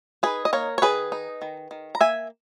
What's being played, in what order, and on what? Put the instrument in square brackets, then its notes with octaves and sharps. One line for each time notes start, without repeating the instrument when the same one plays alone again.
[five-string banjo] D#4 G#4 B4
D#5
A#3 A#4 C#5
C#5
D#3 G#4 B4
D#4
D#3
D#3
A#5
A#3 E5 G#5